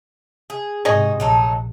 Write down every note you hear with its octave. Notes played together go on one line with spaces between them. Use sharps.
G#4
G#2 C3 D#4 F#4 G#4 D#5
A#1 F#3 D#4 A4